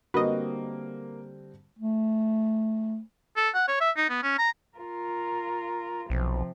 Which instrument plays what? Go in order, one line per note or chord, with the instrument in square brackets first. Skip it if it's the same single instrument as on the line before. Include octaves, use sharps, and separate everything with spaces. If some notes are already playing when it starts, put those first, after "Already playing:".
[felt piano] D3 G3 C4 [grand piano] A#3 [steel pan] F#4 [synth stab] B4 D#5
[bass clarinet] A3
[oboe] A4
F#5
C#5
E5
D#4
B3
C#4
A#5
[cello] F4 A#4
[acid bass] B1 [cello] C3 F3